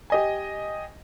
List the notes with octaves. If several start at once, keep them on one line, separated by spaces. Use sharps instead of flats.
G4 D#5 G#5